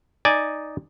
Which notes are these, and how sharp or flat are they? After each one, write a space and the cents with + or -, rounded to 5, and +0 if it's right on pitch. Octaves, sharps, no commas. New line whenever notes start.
D#4 +0 D5 +0 G#5 -5